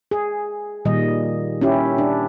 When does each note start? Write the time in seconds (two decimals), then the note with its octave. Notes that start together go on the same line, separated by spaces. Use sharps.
0.11 G#4
0.85 A#2 D#3 G3 D#5
1.61 C#4 E4 G4
1.98 D4